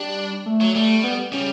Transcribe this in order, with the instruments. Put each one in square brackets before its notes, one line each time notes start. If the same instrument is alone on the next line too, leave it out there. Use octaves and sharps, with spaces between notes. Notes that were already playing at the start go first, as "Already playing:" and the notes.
Already playing: [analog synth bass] G3 [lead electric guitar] D4
[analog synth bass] A3
[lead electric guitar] F#3
[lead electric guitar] G3 [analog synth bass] A3
[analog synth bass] B3
[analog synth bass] C#3 [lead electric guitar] G3